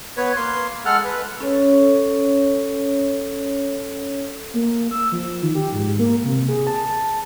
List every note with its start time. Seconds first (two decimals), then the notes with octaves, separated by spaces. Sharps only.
0.17 B3 B4 C#5
0.36 A#3 C6
0.85 G#3 A4 F#5 F6
1.04 B4
1.40 C#4 A4 C#5
4.54 A#3
4.91 E6
5.12 F3
5.42 D#3
5.55 G4
5.72 G#2
5.99 A#3
6.24 C3
6.48 G#4
6.67 A5